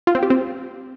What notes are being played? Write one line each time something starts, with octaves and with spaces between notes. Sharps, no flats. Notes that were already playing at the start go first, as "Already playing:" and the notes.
F4
C4
G4
C4